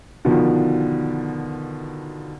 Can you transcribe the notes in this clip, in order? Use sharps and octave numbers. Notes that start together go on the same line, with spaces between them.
B2 D3 D#3 F3